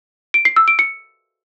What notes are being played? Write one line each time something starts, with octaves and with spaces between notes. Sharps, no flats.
D7
C7
E6
D7
C#7